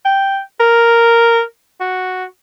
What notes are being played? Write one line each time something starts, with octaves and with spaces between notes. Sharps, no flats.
G5
A#4
F#4